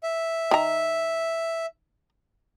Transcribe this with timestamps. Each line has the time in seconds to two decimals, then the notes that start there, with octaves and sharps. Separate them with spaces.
0.03 E5
0.51 D#3 A#5